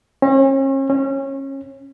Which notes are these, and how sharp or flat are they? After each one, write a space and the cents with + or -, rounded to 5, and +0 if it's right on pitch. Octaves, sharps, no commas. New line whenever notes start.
C#4 -40
C#4 -25